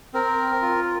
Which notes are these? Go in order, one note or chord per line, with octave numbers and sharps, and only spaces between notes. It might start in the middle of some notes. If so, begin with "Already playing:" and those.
C4 A#4
F4